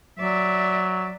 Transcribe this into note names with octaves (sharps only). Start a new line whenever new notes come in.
F#3 D5 E5